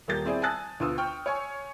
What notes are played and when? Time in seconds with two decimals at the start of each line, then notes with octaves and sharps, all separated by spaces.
0.08 D#1 A#3 G4 G6 A6
0.25 C4 E4 G#4 D5
0.42 G#5 A5 D#6 E6 F#6 A6
0.80 D2 B3 F4 D#6 E6
0.98 G5 C#6 F6 G6
1.26 C#5 G#5 C#6